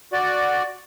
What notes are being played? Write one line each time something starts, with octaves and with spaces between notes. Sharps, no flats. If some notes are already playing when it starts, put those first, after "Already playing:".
F#4 D5